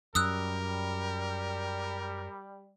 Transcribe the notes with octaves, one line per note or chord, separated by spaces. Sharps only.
F#2 G3 A#4 D#6 E6 F#6